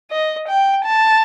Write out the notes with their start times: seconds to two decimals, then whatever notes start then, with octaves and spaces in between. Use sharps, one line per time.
0.11 D#5
0.48 G5
0.85 A5